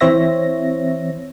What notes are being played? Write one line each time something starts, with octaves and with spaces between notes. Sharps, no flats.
E3 C4 C5 C#5 E5 A#6